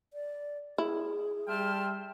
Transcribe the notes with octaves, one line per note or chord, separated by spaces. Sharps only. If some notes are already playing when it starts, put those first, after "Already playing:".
D5
E4 G#4
G3 E5 G5 A5 C6 F6